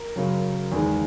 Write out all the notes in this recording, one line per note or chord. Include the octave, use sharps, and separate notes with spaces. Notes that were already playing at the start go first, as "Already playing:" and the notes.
Already playing: A#4
F#2 C#3 F#3
E2 D#3 G#3